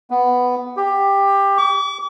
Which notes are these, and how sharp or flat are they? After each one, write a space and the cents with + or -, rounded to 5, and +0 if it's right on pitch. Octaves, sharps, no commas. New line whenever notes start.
B3 +5
G4 +15
D6 -40